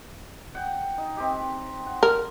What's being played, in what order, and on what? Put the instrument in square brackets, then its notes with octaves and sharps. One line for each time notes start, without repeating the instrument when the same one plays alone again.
[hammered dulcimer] F#5 G5
D#4
C4 D#4 G4
F#5
[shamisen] A#4